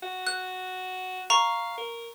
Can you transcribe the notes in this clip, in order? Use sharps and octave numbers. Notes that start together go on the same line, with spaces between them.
F#4
F#6
F5 A#5 C#6
A#4